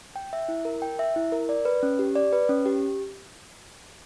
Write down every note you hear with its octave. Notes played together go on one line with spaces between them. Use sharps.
G5
E5
E4
A#4
G5
E5
E4
A#4
D5
B4
C#4
G4
D5
B4
C#4
G4